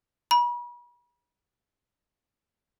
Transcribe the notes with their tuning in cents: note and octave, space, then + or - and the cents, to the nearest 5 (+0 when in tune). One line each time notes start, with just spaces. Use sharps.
B5 -40